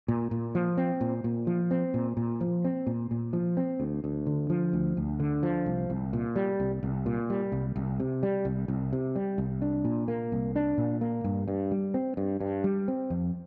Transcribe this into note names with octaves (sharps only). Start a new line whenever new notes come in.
A#2
A#2
F3
C4
A#2
A#2
F3
C4
A#2
A#2
F3
C4
A#2
A#2
F3
C4
D2
D2
D3
F3
D2
D2
D3
F3
C2
C2
A#2
G3
C2
C2
A#2
G3
C2
C2
C3
G3
C2
C2
C3
G3
C2
D4
A#2
A#3
C2
D4
A#2
A#3
G2
G2
G3
C4
G2
G2
G3
C4
F2